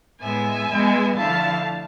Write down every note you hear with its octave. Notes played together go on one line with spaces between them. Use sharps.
A2 G#3 B3 E5 G#5
B2 G#3 B3
D3 F3 A3 E4 F5 A5